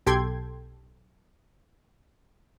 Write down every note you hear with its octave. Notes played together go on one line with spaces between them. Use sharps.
B1 G4 A4 G5 C6 G#6